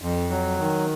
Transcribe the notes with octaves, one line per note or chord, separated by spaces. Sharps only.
F2
F#3
D#3